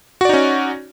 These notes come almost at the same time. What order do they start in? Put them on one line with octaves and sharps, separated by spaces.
F#4 D5 D#4 C#4